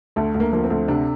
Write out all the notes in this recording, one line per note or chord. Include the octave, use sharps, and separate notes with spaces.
D2 A3
D2
A#3
F3 A#3
C4
D2
C3 D4